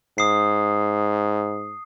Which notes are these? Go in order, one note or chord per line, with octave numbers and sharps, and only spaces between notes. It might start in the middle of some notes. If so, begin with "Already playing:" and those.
G#2 D#6 C7